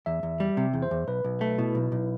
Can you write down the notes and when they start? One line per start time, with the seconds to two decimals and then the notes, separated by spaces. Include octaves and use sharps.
0.06 E2 E5
0.23 E2
0.40 G3
0.57 C3
0.73 E2
0.82 C5
0.91 E2
1.08 B1 B4
1.24 B1
1.41 A3
1.58 B2 E4
1.75 B1
1.92 B1